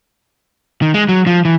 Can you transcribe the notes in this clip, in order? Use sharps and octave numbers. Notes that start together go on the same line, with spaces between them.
D#3
G#3
F#3
F3
E3